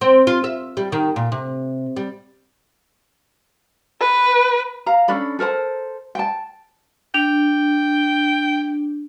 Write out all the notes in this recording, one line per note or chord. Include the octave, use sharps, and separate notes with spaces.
C4
F4
E5
G3
D#3
A#2
C3
G3
B4
F5 A#5
C#4 D4 A4 B5
A4 A#4 C5 A5
G5 A5
D4 G5